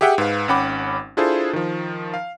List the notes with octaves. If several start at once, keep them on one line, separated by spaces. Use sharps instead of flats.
G4 G#4 E5 F#5 G5
G#2 B4 F5
G#1 C#4 F#5 G5 B5 D6
D4 E4 F4 G#4 A4 C5
D#3 F3
F5